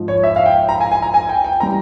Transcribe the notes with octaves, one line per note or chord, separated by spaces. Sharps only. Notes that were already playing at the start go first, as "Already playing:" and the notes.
Already playing: G#2 F3
C#5
E5
F5
G5
A#5
G#5
G#5
A#5
G#5
G5
G5
E3 G3 A#5